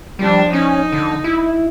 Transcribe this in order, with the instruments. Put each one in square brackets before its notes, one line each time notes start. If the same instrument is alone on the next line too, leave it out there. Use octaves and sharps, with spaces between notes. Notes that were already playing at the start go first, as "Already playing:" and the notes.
[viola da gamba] F3 D4 [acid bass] G3
[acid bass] C#4 [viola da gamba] D#4
[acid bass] D3
E4